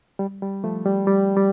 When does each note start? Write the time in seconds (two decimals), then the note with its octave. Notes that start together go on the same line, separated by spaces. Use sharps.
0.19 G3
0.42 G3
0.64 F3 A3
0.86 G3
1.07 G3
1.37 G3